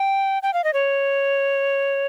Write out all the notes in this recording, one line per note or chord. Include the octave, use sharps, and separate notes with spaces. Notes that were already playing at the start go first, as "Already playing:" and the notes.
Already playing: G5
G5
F5
D#5
C#5